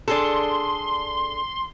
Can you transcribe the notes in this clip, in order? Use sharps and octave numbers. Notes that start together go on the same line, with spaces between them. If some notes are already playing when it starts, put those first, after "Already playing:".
D4 G#4 A4 C6